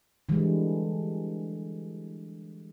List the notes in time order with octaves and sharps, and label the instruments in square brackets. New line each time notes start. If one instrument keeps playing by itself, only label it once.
[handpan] D3 E3 G3 G#3